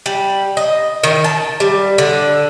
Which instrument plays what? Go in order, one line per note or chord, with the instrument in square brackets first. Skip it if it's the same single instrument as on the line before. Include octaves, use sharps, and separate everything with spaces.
[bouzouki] G3
D#5
D#3
A5
G3
D3